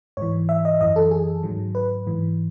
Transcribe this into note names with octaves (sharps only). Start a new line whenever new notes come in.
G#2 E3 C#5
E5
D#5
F#2 E3 D#5
A4
G#4
G#2 D#3 F#3
B4
G#2 E3